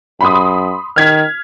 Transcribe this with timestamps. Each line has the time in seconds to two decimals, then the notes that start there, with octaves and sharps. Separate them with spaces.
0.21 F#2 B5 C6 D#6
0.96 D#3 F6 G#6 B6